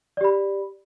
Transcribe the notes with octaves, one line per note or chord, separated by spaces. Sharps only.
G4 D5 B5